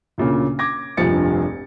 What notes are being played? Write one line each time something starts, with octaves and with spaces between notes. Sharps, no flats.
D2 A#2 C#3
D6 G#6 A#6
F1 A#1 G2 F3 A6 C#7